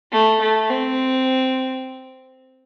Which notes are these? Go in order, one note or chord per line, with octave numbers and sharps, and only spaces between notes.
A3
A3
C4